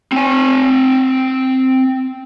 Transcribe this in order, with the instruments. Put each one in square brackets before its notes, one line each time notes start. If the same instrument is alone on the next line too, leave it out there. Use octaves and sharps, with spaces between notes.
[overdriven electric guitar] C4 G#5